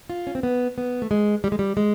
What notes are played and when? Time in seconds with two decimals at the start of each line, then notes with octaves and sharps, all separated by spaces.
0.10 F4
0.27 C#4
0.35 C4
0.43 B3
0.78 B3
1.02 A3
1.11 G#3
1.44 G3
1.52 G#3
1.59 G3
1.77 G#3